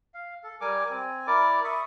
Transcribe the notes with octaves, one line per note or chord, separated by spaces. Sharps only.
F5
A4
G3 A#4 G#5 D6
C4 G#5
E4 A#4 D5 D6
E5 B5 C#6 D#6